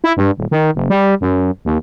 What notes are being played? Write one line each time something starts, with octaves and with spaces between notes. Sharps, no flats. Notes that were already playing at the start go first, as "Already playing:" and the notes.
E4
G2
D#1
D#3
F#1
G3
F#2
D#2